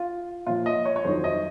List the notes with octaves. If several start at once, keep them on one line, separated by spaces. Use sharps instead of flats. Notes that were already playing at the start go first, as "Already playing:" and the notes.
Already playing: F4
A#2 F3 F4
D#5
C#5
C#5
F2 D#3 F#3 C5
D#5